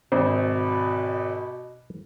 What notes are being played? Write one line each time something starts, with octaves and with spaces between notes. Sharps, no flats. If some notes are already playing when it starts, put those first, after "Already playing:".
G#1 B2 C5